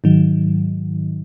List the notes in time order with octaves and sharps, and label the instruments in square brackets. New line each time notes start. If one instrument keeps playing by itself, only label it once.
[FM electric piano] G#2 D#3 F#3